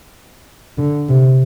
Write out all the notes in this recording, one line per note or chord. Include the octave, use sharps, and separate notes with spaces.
D3
C3